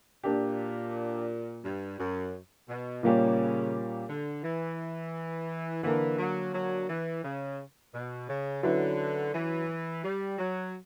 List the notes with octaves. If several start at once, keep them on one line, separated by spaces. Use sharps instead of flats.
A#2 A#3 D4 G4
G2
F#2
B2
A#2 C#3 G3 A#3 C#4 G4
D3
E3
D3 E3 A#3 D4 A#4
F#3
F#3
E3
C#3
B2
C#3
D3 F#3 C#4 E4 B4
E3
G3
F#3